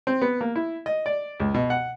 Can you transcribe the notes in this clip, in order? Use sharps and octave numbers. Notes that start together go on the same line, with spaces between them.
C4
B3
A#3
E4
D#5
D5
C#2
B2
F#5